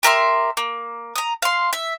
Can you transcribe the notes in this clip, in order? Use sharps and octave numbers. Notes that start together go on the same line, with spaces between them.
G4 A#4 E5 C6
A#3
A#5 D#6
F5 C6
E5